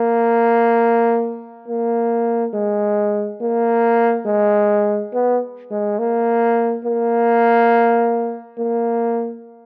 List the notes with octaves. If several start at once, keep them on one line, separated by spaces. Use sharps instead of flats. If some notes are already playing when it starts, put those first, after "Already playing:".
Already playing: A#3
A#3
G#3
A#3
G#3
B3
G#3
A#3
A#3
A#3